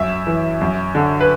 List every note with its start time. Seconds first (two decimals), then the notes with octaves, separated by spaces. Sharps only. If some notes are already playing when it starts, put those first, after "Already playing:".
Already playing: F#2 E5
0.27 E3
0.61 F#2
0.95 D3
1.21 B4